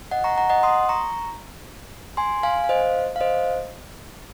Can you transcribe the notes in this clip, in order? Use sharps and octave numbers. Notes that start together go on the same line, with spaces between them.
D#5 F#5
A#5 C#6
F#5 A#5
D#5 F#5
C6 D#6
A#5 C#6
G#5 C6
F5 G#5
F5
C5 D#5
F5
C5 D#5